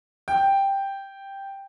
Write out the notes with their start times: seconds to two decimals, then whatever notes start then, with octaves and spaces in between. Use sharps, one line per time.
0.28 G5